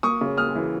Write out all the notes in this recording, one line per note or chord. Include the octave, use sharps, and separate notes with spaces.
A#3 C#6 D#6
C#3
A#3 D#6 F6
E3